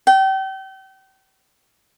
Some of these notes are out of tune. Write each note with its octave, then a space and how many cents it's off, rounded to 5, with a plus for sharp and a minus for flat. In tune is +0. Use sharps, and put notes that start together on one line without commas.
G5 -35